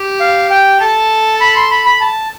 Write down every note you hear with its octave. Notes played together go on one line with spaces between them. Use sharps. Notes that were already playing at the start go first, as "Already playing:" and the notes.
Already playing: G4
F5
G5
A4 A5
B5
C6
B5
B5
A5